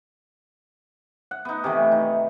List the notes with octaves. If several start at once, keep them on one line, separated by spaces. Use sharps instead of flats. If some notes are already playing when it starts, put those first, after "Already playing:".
F#5
B3 D#4
C3 D#3 E3 A3
D#4